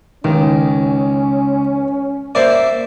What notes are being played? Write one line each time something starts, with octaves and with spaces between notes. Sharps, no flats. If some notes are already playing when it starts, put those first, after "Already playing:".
C#2 D#3 C#4
A#3 A#4 C5 D5 E5